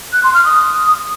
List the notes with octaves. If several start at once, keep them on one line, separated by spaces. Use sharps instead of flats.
F#6
C6
F6
D#6